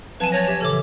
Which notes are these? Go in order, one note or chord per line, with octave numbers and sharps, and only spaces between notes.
F3 F#3 C4 B4 G#5 A5
C#5 A6 A#6
G4 E5
A#2 C#3 E3 A4 D6